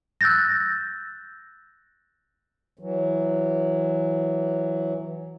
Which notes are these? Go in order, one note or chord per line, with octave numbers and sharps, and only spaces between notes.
E6 F#6 G6 A6 A#6
E3 F#3